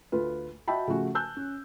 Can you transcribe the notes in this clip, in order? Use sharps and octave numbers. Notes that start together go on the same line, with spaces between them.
D2 F4 B4
F#4 D#5 E5 G5 A5 B5
C#3 F3 A3 F#4 G#5
G#5 A5 E6 F#6 G6
C#4